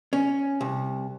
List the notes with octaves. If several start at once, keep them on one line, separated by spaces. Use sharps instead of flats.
C#4
C2